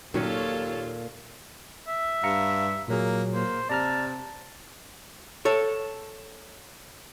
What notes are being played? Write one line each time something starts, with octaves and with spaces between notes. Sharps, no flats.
D#2 A#2 D#3 F#3 C#4 F4 A4 C#5
E5
G2 F5 A#5 C#7
A#2 F#3 A#3 G#4
A#3 C5
C3 D5 A5 A#5 F6
A4 C#5